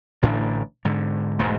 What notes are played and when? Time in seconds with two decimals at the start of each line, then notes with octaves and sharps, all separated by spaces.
0.22 A1 A2 D3 D4
0.85 G#2 D3
1.39 E1 G#2 G#3 A3